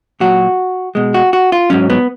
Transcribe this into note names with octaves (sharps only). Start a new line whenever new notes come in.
A#2 F#3 F#4
B2 G#3
F#4
F#4
F4
G#2 F#3 C#4
B3